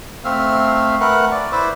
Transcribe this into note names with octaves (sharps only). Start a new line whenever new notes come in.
A3 C4 E5 F5
A3 A#4 B4 F#5
D5
E4 B4 C5 D5 E5